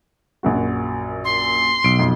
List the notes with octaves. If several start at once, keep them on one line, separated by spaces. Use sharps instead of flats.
A#1 F#2 F#4
C6
B1 D7
F2